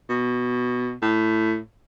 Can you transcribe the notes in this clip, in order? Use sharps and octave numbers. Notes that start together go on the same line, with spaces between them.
B2
A2